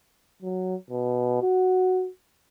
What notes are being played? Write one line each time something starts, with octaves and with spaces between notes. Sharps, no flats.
F#3
B2
F#4